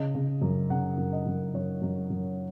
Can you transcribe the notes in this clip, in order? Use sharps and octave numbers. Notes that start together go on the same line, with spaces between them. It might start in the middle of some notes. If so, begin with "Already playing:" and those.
Already playing: C#3 D#5
C#3
F#2
C#3 F#5
F#2
D#5
F#2
F#2 C#5
F#2
F#2